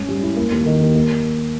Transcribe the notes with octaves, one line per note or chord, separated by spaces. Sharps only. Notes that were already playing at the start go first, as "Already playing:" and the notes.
Already playing: G#2 C#4
G3
E4
A#3
D#2
D#3
D#2
A#3